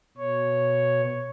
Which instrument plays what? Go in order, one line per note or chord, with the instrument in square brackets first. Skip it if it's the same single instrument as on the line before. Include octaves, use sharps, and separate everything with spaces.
[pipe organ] B2 C#5